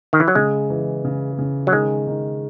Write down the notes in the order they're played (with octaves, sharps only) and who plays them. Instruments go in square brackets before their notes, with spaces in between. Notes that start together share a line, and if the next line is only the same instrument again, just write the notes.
[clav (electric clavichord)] D#3
E3
F#3
[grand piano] C#3 [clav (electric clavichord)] G#3
[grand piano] E3
C#3
C#3
[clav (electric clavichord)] F#3
[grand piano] D#3 [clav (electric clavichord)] G#3
[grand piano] D#3